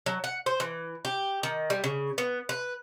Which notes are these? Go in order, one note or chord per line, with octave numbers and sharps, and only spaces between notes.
F#3
F#5
C5
E3
G4
D#3
G3
C#3
B3
B4